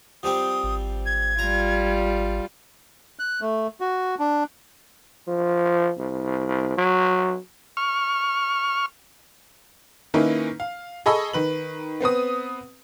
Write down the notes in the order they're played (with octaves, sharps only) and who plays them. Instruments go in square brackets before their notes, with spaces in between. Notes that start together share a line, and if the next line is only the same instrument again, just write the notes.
[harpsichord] F3 G3 C4 [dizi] D#6
[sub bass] G#1
[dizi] G#6
[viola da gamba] G3 F4 [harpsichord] A#5
[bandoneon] F#6
A3
F#4
D4
[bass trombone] F3
C2
F#3
[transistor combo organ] C#6 F6
[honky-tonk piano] D#3 A#3 C#4 D#4 E4 B4
F5
G#4 A4 D#5 B5 C#6 E6
D#3 B4 F#7
B3 C4 B4 D#6